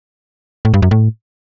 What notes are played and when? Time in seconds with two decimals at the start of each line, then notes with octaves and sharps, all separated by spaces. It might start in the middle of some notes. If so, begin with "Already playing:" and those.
0.65 A2
0.74 G2
0.82 F#2
0.91 A2